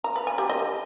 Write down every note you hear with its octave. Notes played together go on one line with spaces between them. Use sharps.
A#5
B4
G#5
G4
D#5